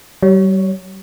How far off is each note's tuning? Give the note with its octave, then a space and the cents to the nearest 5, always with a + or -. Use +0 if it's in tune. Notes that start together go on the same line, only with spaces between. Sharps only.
G3 -40 C#5 +5